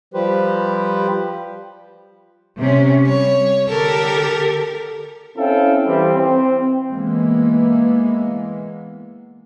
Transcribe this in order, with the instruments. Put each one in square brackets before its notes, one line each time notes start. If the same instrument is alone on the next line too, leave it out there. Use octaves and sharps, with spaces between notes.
[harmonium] F3 G3 G4 B4 C5
[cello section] C3 C#4
[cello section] G3 [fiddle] C#5
[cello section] D3 G4 A4 [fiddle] A#4
[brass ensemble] C4 C#4 E4 A4 F5 G5
E3 G3 C4
C4
[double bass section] E3 G#3 A#3 B3